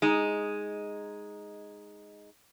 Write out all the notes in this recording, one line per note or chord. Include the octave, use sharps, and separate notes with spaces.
G#3 D#4